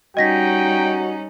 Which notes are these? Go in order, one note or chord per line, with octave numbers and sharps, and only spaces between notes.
G3 C#4 D#4 F#4 D#5 G5 A#6 B6